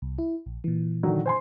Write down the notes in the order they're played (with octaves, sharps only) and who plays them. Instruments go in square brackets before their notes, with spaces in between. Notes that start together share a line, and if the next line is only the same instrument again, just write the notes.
[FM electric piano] C2
E4
A#1
A#2 E3
[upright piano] D3 D#3 F#3
C5 G#5 C6